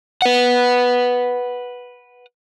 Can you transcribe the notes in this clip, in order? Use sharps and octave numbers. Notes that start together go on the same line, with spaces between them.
B4 F#5